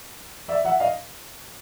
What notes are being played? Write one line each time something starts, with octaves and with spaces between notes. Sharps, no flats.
D5 E5
E5 F#5
D#5 F5